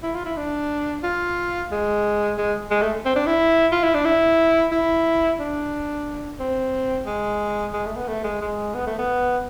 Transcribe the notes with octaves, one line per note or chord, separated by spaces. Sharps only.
E4
F4
E4
D4
F4
G#3
G#3
G#3
A3
C4
D4
E4
F4
E4
D4
E4
E4
D4
C4
G#3
G#3
A3
B3
A3
G#3
G#3
B3
A3
B3